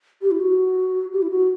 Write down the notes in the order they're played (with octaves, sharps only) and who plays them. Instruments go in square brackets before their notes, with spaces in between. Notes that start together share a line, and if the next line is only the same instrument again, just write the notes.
[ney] G4
E4
F#4
G4
E4
F#4